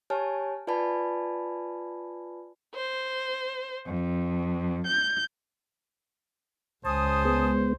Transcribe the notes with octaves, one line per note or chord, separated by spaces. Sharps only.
G4 C#5 G#5 A5 F6
F4 B4 D5 G#5 A5 B5
C5
F2
G6
C#2 C5 G#5 A5 D#6
G#3 B3